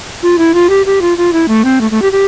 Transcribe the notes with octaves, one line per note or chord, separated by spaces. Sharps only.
F4
E4
F4
G4
G4
F4
F4
E4
A3
C4
A3
A3
G4
G4